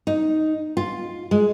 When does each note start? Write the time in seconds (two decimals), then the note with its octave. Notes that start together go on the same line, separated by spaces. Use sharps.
0.07 D#4
0.77 F4
1.31 G#3